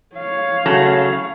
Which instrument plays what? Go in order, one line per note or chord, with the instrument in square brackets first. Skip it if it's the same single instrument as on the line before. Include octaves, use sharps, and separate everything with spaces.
[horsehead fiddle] C#5 F5
[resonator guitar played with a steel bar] C#3 F#3 A3